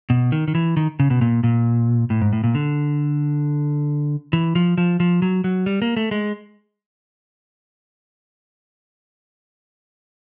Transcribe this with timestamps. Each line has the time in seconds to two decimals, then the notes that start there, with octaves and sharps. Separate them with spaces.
0.10 B2
0.32 D#3
0.48 D#3
0.55 E3
0.77 D#3
1.00 C#3
1.10 B2
1.21 A#2
1.44 A#2
2.10 A2
2.21 G#2
2.33 A2
2.44 A#2
2.55 D3
4.33 E3
4.55 F3
4.78 F3
5.00 F3
5.22 F#3
5.44 F#3
5.66 G3
5.82 A#3
5.97 A3
6.11 G#3